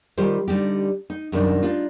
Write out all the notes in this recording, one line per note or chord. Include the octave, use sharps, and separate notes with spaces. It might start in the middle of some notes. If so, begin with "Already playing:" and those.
D#3 G3 F4 G4 C5
D3 G3 D#4 G4
D#4
F#2 C3 D#3 G3 D4 D#4
D4 D#4 F4